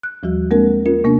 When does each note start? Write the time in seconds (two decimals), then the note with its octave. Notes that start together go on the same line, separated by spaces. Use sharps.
0.03 F#6
0.23 D#2 F3 G3 F#4
0.51 G#3 A#3 C4 D4 A#4
0.86 C#4 F4 A#4
1.04 C3 A#3 B3 C#4 D4